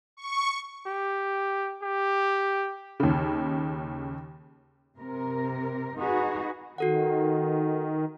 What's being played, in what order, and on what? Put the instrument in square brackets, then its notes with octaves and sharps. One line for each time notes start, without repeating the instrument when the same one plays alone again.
[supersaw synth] C#6
[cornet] G4
G4
[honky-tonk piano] D#2 C#3
[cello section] C3 A#4
D#4 F#4 G#4 B4
[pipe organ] D#3 [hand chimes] F#4 A4 F#5